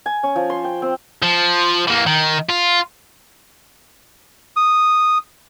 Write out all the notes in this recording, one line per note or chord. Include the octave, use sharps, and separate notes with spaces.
G#5
C#4
F3
C6
G5
C4
F3
E3 A#3
D#3
F4
D#6